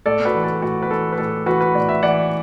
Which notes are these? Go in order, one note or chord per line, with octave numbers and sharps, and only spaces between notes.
A2 A4 D5
F#4 B4
E3
A4
A2 F#4
B4
E3 A4
B4
A2 A4
E3 F#4 B4
B4
A2 D5
E5
E3 D5 F#5